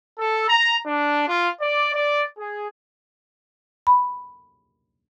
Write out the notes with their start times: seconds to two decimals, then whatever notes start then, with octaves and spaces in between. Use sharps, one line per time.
0.18 A4
0.47 A#5
0.86 D4
1.28 F4
1.60 D5
1.93 D5
2.37 G#4
3.87 B5